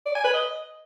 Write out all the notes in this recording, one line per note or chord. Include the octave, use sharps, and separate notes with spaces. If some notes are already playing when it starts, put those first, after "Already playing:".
D5
G#5
B4
D#5